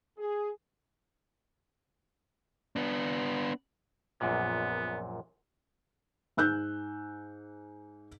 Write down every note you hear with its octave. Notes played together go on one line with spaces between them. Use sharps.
G#4
B3 D4
A#1 F#2 A#2 B3
G#2 E6 F#6 G6